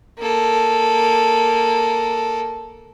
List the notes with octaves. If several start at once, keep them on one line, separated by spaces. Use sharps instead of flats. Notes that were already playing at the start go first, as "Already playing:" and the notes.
A#3 A4